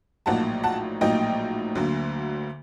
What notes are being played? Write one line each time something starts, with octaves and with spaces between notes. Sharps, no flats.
A#1 A2 F#3 A#3 D#4 F#5 A5
F#5 A5
A#1 A2 F#3 A#3 D#4 D#5 G5
D2 D3 F#3 A#3